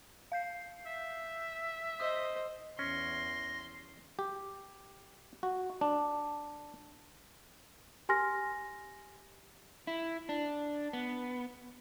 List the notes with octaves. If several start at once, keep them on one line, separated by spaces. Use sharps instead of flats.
F5 G6 C7
E5
C5 D#5 D#6 E6
E2 C#4 C6 A#6
G4
F#4
D4
G4 G#5 C6 F6 A#6
E4
D4
B3